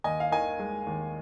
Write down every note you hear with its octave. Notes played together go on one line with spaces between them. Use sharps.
D#2 D#5 G#5
F5
D#3 D#5 G#5
G#3
D#2